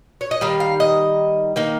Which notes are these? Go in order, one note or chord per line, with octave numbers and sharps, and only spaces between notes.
C#5
D#5
D#3 G3 F5
F5
D#5
D#3 A#3 D#4